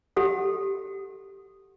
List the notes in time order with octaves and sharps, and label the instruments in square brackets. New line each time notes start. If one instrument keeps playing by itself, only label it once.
[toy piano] G4 A4 F#5